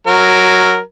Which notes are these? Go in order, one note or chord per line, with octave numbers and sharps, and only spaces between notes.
F#3 A#4